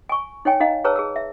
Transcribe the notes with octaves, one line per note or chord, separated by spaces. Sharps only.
G#5 C#6
D#4 C#5 G5 G#5
D#4 D#5 F5 A#5
G#4 B4 C#5 A5 A#5 E6
G#4 A5 E6
E5